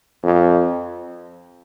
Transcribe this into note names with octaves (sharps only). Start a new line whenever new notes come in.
F2